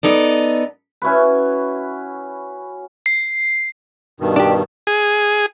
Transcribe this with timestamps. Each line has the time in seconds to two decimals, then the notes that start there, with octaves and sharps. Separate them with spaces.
0.03 B3 D#4 A4 D5
1.02 C#4 E4 F#4 B4
3.06 C7
4.20 G2 B2 D#3
4.36 D4 G4
4.87 G#4